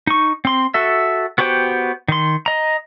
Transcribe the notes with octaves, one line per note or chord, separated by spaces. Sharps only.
D#4 C#6
C4 C6
F#4 A4 E5
B3 F#4 G4 C5 G5
D#3 C6
D#5 A#5